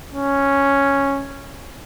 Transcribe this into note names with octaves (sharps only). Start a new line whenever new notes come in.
C#4